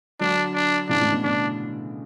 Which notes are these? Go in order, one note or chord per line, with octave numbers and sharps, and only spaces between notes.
D3 F#3 D4
D4
C#3 E3 D4
A2 C#3
B2 D3
B2 D3 D4